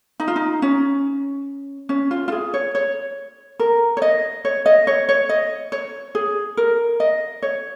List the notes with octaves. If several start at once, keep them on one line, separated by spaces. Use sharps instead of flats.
D#4
F4
D#4
C#4
C#4
F4
F4
G#4
C#5
C#5
A#4
C#5
D#5
C#5
D#5
C#5
C#5
D#5
C#5
G#4
A#4
D#5
C#5